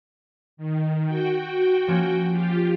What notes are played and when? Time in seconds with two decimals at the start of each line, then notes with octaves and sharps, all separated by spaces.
0.57 D#3
1.06 F#4 G5
1.88 F3 A#3 C#4
2.29 F4 G4